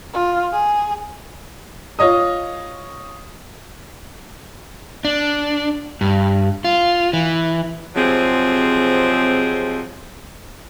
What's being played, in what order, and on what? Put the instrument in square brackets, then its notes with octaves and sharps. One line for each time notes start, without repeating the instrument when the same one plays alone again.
[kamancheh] F4
G#4
[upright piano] F4 C#5 D#5 D#6
[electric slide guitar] D4
G2
F4
E3
[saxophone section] C3 F3 F#3 G#3 C4 G#4